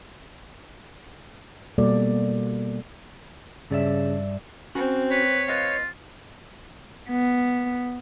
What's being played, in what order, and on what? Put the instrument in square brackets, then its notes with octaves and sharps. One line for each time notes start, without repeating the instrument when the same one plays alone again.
[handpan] B2 G3 A#3 A4 D5
[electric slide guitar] G2 D5 E5 [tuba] C#3
[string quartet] C4 [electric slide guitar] C#4 F#4
[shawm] B4 [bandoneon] C#5
[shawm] F4 [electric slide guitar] B4 D#5 F5
[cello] B3